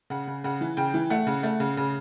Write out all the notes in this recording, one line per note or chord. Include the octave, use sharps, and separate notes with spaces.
C#3 F#5
C#3
C#3 F#5
E3
C#3 G5
E3
A3 F#5
C#3
A3
C#3
C#3